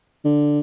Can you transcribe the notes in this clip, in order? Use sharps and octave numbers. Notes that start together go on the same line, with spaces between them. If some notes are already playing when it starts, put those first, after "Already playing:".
D3